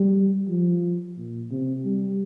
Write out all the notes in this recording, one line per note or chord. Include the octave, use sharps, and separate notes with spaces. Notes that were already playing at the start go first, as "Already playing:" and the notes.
Already playing: G3
F3
A#2
C3
G3